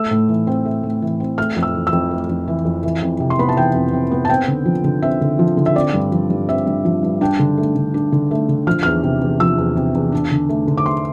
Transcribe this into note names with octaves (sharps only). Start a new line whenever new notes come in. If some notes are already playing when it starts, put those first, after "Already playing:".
Already playing: A3 E6
A2
E3
C4
A3
A2
E3
C4
A3 F6
F2
E6
E3
E6
F2
A3
F2
E3
F2
E3
F2
C3
C6
B3 B5
A5
E3 G5
F2
C3
B3
A5
C4 G5
D3
F3
D3
C4 E5
D3
F3
D3
E5
C4 D5
G2
F3
G2
C4 E5
G2
F3
G2
D4 G5
D3
A3
D3
D4
D3
A3
D3
F3 F6
E2 F6
C3
E2
F3 E6
E2
C3
E2
D4
D3
A3
D3
D6
D4 C6